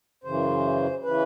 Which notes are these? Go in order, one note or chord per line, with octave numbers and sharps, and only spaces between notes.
F#2 C#3 E3 C5
C#3 E3 B4